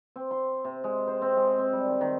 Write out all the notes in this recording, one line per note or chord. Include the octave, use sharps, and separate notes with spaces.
C4
C6
C3
G#3
C5
C4
G#3
C4
G3
D#3
D#3